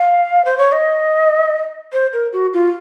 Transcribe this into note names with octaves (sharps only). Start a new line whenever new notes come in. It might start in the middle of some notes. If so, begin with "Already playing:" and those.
Already playing: F5
C5
C#5
D#5
C5
A#4
F#4
F4